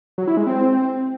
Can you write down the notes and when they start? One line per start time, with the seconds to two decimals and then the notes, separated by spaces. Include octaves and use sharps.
0.18 F#3
0.28 E4
0.37 G#3
0.47 C4